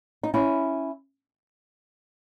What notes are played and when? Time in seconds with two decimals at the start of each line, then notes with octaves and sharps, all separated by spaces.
0.23 D#4
0.34 C#4 E4